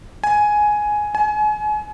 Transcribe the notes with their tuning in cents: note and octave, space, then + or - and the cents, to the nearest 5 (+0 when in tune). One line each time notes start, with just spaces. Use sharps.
G#5 +10
G#5 +35